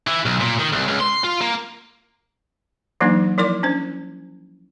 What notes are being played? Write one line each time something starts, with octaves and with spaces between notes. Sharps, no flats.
E3
B1
A#2
D#3
C2
C#2
C6
F4
A#3
E3 F#3 A#3 D4 D#4
F3 E4 A#4 D5 D6
C#4 D4 C5